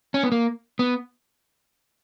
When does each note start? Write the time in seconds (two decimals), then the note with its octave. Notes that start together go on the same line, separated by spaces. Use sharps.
0.14 C#4
0.23 B3
0.32 A#3
0.79 B3